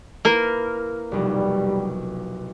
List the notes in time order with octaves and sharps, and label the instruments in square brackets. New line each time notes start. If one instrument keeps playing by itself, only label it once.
[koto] A#3 A#4 [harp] E4 B4
[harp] F1 B1 [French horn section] G3